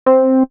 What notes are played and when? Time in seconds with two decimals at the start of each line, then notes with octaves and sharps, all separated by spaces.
0.06 C4